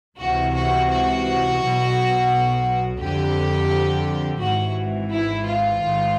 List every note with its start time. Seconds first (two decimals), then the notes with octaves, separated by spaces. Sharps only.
0.18 C#2 C3 E3 F#4
0.53 F#4
0.89 F#4
1.59 B1 B2
2.99 F2 D3 G4
4.40 G#1 G#2 E3 F#4
5.10 E4
5.45 F4
5.81 A1 G#2 D#3